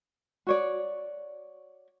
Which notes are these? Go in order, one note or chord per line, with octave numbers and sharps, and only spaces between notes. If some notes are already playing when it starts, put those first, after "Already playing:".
F#4 C#5 D5